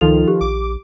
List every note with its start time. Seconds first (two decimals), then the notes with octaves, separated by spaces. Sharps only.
0.01 C#2 D#3 F3 D#4 F4 A4 F7
0.28 G4
0.41 A#1 D6